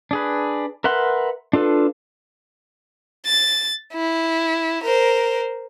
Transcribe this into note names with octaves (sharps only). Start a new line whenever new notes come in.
D4 G#4 B4
A#4 B4 E5 F#5 C6
D4 F4 A4 B4
A6
E4
A#4 C5